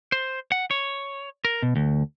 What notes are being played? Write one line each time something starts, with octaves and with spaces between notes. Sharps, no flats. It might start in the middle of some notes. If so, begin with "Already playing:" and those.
C5
F#5
C#5
A#4
B2
D2